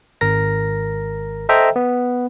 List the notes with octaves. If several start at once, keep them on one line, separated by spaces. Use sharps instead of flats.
G#1 A#4 A#6
A4 C5 D#5 E5 G5 A#5
B3